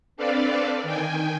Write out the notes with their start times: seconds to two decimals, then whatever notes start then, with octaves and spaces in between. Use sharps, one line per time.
0.16 C4 D4 A4 B4 D5 F5
0.83 D#3 G5 G#5